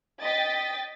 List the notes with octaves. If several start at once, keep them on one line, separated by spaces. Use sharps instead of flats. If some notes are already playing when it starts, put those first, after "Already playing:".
D#5 G5 A6 B6